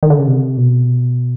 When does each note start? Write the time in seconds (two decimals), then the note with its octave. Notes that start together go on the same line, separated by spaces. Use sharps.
0.03 D#3
0.10 D3
0.19 C#3
0.27 C3
0.57 B2